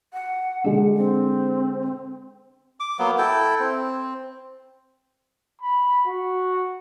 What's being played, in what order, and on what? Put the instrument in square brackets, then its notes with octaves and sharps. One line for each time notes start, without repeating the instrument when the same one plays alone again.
[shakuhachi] F#5
[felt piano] D3 G#3 D4
[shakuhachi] C4
[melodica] D6
F#3 A#3 B3
E4 A4 G5
C4
[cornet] B5
F#4